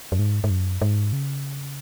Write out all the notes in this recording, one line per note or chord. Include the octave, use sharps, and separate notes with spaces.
F#2
G#2
G#2
F#2
G#2
C#3